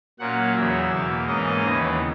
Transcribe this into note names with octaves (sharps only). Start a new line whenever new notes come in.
A#2 F#3 A#3 C#4 F#5
E2 C#3 F#3 E5
E2 B2 A#3
G#2 E3 A#3 C#4 D#5
D#2 C#3 E3 B3